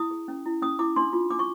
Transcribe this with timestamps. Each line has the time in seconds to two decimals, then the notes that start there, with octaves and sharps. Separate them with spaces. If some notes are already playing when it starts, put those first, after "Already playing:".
Already playing: E4 D#6
0.11 G#4
0.28 C#4
0.46 E4
0.62 C#4 D#6
0.79 E4 D6
0.96 D4 C6
1.13 F4
1.30 D4 D6
1.39 C#6